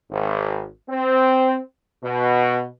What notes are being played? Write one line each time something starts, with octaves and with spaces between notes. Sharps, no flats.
G#1
C4
B2